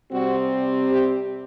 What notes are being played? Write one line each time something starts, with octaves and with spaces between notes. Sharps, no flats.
C3 G3 C4 F#4
G4